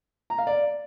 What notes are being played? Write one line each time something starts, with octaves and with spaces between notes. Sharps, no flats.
A#5
F5
D5